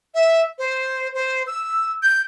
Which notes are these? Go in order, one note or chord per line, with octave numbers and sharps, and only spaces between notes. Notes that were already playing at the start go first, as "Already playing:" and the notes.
E5
C5
C5
E6
G6